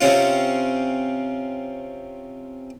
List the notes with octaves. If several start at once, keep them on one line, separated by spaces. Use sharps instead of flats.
C3 C4 C#4 F4